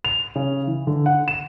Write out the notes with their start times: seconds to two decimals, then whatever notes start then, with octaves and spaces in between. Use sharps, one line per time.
0.05 F7
0.36 C#3
0.67 E3
0.87 D3
1.06 F#5
1.28 E7